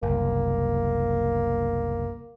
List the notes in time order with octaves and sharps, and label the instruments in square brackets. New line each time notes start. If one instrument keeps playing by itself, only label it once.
[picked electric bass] F#1 C2 [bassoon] A#3